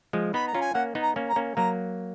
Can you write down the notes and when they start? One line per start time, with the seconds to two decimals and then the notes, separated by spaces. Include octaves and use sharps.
0.13 F3 G#3
0.34 B3 D#4 B5
0.47 A#5
0.54 C#4 F4
0.61 G#5
0.74 A#3 C#4 F#5
0.95 B3 D#4
1.03 A#5
1.16 A#3 C#4
1.29 A#5
1.36 A#3 C#4
1.57 F#3 A#3 A#5